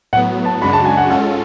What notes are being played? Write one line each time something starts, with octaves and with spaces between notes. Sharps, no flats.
A2 F#3 B3 F#5
A5
F#2 C#3 G#3 D4 F#4 B5
A5
G#5
F#5
G#2 G#3 C#4 F4 A4 F#5